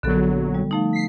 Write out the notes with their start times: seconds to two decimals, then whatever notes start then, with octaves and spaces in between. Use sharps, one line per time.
0.03 A#1 D3 F#3 B3 A4
0.55 G3
0.71 F3 A3 D#4
0.93 B6 C7